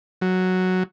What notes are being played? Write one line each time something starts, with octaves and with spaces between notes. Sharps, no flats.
F#3